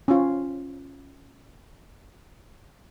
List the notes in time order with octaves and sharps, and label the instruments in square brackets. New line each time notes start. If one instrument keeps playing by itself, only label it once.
[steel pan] C#4 F4